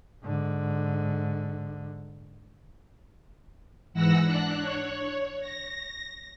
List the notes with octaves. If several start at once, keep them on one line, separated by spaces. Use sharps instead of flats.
G#2 D3
G#2 E3 F#5 E6 A#6
D4 F#6
C#5
A#6